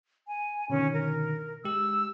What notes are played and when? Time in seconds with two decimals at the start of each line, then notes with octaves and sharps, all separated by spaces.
0.27 G#5
0.70 B2 D3 D#3 C#4
0.94 A#4
1.65 G#3 G4 E6